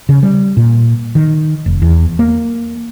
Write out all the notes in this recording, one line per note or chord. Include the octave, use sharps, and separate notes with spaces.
C#3
G3
A#2
D#3
F1
E2
A#3